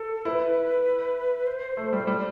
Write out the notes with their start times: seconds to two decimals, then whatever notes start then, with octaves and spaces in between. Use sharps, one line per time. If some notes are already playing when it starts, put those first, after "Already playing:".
Already playing: A4
0.25 E4 C5
0.31 B4
1.47 C5
1.77 A3
1.93 G3
2.07 G3